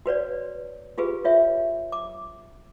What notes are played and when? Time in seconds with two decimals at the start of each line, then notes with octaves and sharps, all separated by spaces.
0.06 F#4 B4 C#5 D5
0.98 F4 G4 G#4 B4
1.25 F4 C#5 E5
1.92 D6